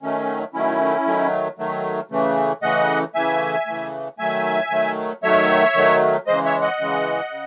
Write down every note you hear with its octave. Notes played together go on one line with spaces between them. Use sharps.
D#3 F#3 A3 C#4
D#3 F#3 A3 C#4 E4
D#3 F#3 A3
D#3 F#3 A3
C#3 E3 A3
C#3 E3 A3 D#5 F#5
C#3 E3 A3 E5 G#5
C#3 E3 A3
D#3 F#3 A3 E5 G#5
D#3 F#3 A3
D#3 F#3 A3 C#5 E5
D#3 F#3 A3
C#3 E3 G#3 C5 D#5
C#5 E5
D#5 F#5
C#3 E3 G#3
C#3